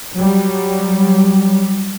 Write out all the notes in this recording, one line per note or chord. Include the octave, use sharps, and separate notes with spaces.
F#3 G3